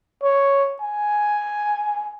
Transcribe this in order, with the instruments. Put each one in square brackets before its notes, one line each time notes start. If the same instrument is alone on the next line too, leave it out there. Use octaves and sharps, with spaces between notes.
[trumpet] C#5
G#5